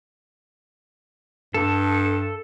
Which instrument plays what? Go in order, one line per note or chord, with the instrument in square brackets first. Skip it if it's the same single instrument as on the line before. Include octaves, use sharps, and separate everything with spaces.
[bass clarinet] G2 [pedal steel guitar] A4